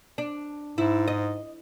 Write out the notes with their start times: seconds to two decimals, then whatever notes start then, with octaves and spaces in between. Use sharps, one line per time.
0.18 D4
0.78 G#2 E4
1.08 D#5